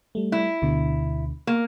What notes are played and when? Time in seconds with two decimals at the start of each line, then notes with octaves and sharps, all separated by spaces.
0.15 G3 A3
0.32 E4
0.62 D2 B2 D3
1.47 A#3